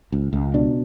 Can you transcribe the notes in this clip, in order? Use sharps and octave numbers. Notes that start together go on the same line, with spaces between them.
C#2
C#2
B2 D4